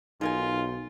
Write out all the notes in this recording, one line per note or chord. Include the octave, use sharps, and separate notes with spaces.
B1 D#4 F4 G#4 A#4 G#5